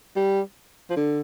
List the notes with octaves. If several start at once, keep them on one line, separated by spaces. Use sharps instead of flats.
G3
F3
D3